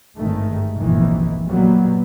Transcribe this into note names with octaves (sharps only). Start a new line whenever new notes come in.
G#1 G2 D#3 G#3 A3
F1 A#1 F#2 D#3 E3
A#2 F#3 G3 A#3 B3